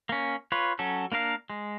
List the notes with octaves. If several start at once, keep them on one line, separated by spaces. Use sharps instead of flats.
A#3 C#4
F4 B4 C#5
F#3 C#4 A4
A#3 D4 A#4 F5
G#3